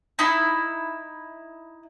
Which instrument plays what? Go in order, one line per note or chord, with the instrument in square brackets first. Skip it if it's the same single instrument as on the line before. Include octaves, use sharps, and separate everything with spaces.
[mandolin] D#4 E4